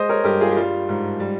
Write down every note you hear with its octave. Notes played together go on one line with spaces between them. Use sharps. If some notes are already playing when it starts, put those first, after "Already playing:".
Already playing: G#3 C5 D#5
A#4 C#5
G2 G4 A#4
F4 G#4
G4
G3 F4
G#2
G3